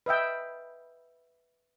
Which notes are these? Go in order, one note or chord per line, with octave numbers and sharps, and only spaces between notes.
B4 D#5 E5 G5